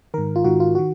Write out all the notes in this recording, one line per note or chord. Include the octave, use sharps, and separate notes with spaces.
G#2 D#3 A#4
F4
G#2 D#3 F#4
F4
D#3 F#4